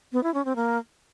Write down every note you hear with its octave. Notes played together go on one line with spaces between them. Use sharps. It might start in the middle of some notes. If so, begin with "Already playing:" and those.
B3
E4
C#4
C4
A#3